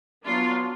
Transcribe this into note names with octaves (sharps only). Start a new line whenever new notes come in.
F#3 B3 D4 F4